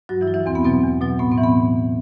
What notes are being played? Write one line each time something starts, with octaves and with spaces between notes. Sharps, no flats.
G2 F#3 F#4
E3 E4
F#3
E3 E4
E2 C4
B3
B2 F#3 C4
E2
B2 F#3
A2 B3
C4
E3
B3